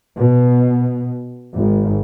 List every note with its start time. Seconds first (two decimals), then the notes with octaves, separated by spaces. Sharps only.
0.17 B2
1.54 G#1